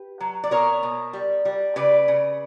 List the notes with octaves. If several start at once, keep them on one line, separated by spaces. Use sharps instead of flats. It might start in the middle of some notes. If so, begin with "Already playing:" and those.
Already playing: G4 B4
F#3
D5
B2 A#4 C#5
B2
G3
G3
C#3 B4 D5
C#3